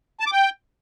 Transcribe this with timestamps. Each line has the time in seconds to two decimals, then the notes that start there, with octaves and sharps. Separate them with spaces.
0.20 A5
0.26 D6
0.32 G5